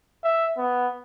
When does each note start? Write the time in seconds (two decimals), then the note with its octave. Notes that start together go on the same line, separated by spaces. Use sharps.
0.24 E5
0.58 B3